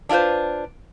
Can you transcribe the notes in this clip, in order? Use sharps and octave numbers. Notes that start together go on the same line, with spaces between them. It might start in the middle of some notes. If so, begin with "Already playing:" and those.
D4 E4 F4 B4 C5